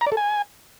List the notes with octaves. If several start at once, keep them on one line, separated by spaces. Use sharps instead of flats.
A#5
D5
A4
G#5